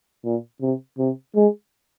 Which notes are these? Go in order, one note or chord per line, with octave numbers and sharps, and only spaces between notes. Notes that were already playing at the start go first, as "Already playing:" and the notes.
A#2
C3
C3
G#3